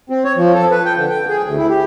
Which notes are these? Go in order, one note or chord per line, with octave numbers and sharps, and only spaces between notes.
C4
C#5
F3
A4
B4
G5
D3
G5
G#4
D2
E4
G4